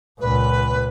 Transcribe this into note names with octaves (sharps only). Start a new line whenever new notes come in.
C#2 A#2 B4